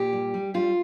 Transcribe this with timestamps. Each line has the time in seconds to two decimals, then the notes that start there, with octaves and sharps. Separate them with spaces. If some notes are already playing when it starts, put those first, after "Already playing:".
Already playing: A#2 G4
0.13 G3
0.34 G3
0.54 G3 F4